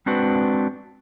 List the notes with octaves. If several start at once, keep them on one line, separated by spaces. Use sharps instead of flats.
G#3 C4 D4 F#4 B4